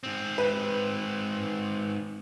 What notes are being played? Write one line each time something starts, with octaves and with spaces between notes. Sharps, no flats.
G#2 C4
B4